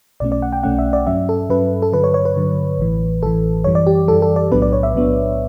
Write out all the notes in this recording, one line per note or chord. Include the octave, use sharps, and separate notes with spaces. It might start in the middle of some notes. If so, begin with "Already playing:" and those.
B1 B2 A3 C#4 D5
D5
F#5
G5
B1 B2 A3 C#4 F#5
E5
D5
G2 F#3 C#4 E5
A4
G2 F#3 C#4 B4
A4
G2 D3 F#3 B4
C#5
C#5
B4
G2 D3 F#3
A1 A2 E3
A1 A2 E3 A4
F#2 E3 G3 C#5
D5
G4
F#2 E3 G3 A4
A4
D5
B1 A2 F#3 B3 D4 B4
D5
C#5
E5
B1 A2 F#3 B3 D4